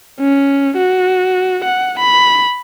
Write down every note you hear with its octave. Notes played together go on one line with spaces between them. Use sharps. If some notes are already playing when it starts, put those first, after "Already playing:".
C#4
F#4
F#5
B5